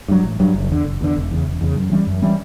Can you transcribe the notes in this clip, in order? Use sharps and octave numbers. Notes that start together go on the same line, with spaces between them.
G2 F#3
A1
G2 F#3
F#1
E2 D3
F#1
E2 D3
E1
E2 C#3
E1
E2 C#3
F#2
E3 G3 C#4
F#2
E3 G3 C#4